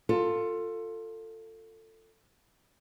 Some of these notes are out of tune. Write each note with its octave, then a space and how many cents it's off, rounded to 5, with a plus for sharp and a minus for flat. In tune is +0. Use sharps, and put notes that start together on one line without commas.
F4 +10 A4 +20